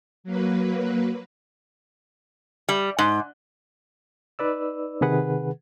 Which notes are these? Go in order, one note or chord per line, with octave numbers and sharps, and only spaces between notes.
F#3 A#3 B4
G3
G#2
D#4 B4 D5 E6
C3 D#3 G#4 B4 F#5